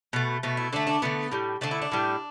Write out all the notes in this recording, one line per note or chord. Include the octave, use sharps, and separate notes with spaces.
B2 A3
B2 A3
E4
D3 A3 D4
D4
D3 A3 B3
A2 G3
D3 A3 D4
E4
D4
A2 G3